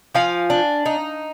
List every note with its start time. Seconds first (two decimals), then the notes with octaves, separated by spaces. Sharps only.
0.15 F3 F5 G#5
0.50 D4
0.86 D#4